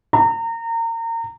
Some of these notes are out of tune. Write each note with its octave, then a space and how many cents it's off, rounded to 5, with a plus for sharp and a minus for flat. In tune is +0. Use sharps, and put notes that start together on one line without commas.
A#5 -30